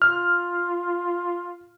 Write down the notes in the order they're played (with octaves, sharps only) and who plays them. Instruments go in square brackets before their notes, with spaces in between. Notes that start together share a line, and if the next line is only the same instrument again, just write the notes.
[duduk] F4 [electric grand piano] F6